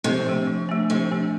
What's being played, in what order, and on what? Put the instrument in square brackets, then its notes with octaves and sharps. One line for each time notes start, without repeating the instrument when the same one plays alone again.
[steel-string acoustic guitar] C3 [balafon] F3
[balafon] A3 D4
F3
A3 D4
[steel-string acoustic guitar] C3 [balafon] F3
[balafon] A3 D4